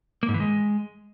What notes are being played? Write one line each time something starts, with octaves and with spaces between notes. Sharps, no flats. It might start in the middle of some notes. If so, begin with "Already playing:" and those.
A#3
G#2
E3
G#3